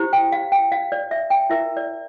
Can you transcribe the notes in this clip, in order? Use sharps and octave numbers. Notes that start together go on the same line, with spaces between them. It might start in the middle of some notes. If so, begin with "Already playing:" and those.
Already playing: E4 G4 C5
G5
F5
G5
F5
D5
E5
G5
E4 A#4 E5
D5